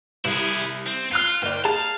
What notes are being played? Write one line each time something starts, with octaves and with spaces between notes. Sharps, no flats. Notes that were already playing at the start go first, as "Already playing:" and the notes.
C2 E4 G#4
C4
F4 F6 F#6 C7
F#1 D5 G5
G#4 F5 A5